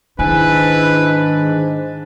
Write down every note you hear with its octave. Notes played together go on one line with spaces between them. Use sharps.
G#2 D#3 D4 E4 B4 G#5